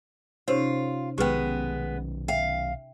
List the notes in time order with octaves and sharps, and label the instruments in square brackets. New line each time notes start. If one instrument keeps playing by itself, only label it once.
[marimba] C3 C#4 D#4 [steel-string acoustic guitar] F4 [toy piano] G4 C5 C#5
[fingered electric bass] B1 D#3 [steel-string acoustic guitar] G#3 B3 [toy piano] G4 B4 G5
[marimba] E5 [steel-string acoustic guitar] F5 [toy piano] G5